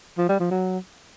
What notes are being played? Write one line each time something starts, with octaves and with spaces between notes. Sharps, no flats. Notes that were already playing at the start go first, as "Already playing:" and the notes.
F3
G3
F3
F#3